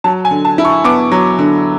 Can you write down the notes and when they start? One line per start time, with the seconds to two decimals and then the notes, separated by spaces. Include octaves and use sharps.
0.04 F#3 A5
0.25 G#5
0.31 D3
0.45 A5
0.58 E4
0.65 C#6
0.84 B3 D6
1.12 F#3
1.39 D3